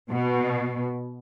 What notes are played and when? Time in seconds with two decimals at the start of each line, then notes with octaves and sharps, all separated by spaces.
0.11 B2